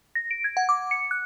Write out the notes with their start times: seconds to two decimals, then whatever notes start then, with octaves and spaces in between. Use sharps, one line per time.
0.15 A#6
0.31 D7
0.44 G#6
0.57 F#5
0.69 D6
0.91 C#7
1.11 F#6